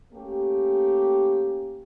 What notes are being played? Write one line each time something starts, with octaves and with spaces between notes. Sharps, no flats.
A3 A#3 C#4 G4